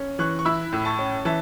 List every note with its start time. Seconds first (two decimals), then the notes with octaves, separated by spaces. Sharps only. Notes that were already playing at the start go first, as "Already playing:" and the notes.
Already playing: C#4
0.19 E3 C#6 F#6
0.39 C#6
0.45 E4 B5 E6
0.73 A2
0.85 A5 C#6
0.99 C#4
1.25 E3 E5 A5